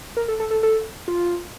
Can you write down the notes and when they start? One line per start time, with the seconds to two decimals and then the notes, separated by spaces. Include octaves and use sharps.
0.17 A#4
0.28 A4
0.40 A4
0.51 A4
0.63 A4
1.08 F4